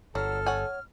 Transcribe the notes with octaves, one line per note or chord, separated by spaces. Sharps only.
G1 F#3 A4 F6
C#5 F#5 G#5